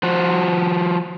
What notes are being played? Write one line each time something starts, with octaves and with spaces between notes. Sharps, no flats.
F3 F4 F#4